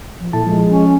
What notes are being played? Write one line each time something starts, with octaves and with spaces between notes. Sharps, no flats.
F3
A#2 E4 A4 A5
F3 G#3
C#4